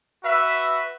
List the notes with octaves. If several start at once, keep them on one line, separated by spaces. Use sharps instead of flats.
F#4 B4 E5